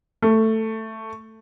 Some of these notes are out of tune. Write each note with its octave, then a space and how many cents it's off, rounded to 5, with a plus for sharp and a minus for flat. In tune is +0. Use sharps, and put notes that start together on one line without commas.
A3 +10